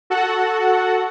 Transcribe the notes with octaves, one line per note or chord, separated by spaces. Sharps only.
F#4 A4 F#5